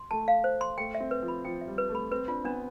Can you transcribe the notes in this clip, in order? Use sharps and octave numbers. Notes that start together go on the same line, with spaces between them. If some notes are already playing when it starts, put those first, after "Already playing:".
Already playing: C6
A3 A5
F5
C5
C6
A3 G5
E5
C4
B4
F3
B5
F3 G5
E5
G3
B4
A3
B5
C4 B4
D4 F4
B3 D4